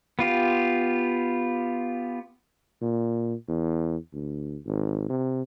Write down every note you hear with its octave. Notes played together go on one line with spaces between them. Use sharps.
B3 F4 G4
A#2
E2
D2
G#1
C3